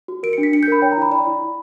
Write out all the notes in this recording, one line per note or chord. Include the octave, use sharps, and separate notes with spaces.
F#4
A#4 D7
C#7
D4
B6
D4 C#7
G6
A#4 B5
C#5 G5
A#5
E4 B5
D5 B5
E4
E4